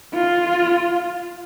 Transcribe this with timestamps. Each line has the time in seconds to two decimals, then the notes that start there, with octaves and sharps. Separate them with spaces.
0.14 F4